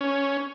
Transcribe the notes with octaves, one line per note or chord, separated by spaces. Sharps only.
C#4